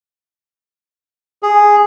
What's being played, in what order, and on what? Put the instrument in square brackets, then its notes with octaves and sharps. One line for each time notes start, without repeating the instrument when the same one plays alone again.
[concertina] G#4